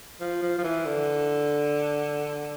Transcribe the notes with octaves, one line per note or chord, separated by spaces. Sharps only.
F3
F3
F3
E3
D3